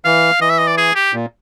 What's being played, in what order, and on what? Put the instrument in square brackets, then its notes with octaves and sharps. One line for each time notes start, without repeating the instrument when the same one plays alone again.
[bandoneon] E3 [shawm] F5
[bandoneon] E3 [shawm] D#5
[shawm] E5
D#5
D5
G#4
G4
[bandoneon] A#2